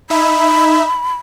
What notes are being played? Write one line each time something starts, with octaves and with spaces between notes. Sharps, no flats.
D#4 E5 B5